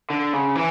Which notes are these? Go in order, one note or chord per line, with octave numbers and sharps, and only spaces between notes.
D3
C#3
E3